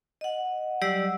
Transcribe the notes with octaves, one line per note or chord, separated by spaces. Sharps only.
D#5 F#5
F#3 G3 G4 D5 F#5 E6